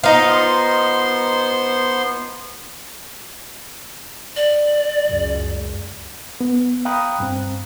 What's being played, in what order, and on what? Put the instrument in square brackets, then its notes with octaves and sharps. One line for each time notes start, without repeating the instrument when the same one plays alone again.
[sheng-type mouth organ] B3 C5 C6 [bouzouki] D#4 F4
[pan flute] D5
[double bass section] C#2 F#2
[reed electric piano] B3
F5 G5 A#5 B5 D#6 F#6
G2 C4